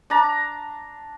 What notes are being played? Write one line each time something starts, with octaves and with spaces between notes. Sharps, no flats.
D4 A#5